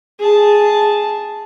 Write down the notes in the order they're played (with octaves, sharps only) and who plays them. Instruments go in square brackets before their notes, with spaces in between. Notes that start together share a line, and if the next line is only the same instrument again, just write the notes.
[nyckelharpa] G#4 A5